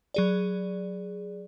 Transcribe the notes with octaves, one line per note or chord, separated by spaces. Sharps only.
F#3 G#4 D5